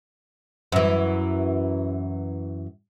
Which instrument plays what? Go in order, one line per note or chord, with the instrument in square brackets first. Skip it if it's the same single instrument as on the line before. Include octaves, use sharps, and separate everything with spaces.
[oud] F#2 E3